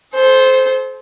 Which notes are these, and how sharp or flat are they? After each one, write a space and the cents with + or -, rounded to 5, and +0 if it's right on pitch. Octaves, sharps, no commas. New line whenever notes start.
A4 -35 C5 +0